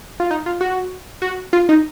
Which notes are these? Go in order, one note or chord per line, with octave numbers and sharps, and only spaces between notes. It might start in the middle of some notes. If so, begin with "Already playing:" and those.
F4
D#4
F4
F#4
F#4
F4
D#4